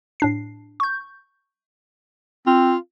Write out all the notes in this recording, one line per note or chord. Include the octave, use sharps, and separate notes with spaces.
A2 D4 C7
C#6 G6
C4 F4